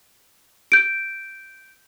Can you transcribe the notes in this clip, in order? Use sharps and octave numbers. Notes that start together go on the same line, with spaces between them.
G6 D7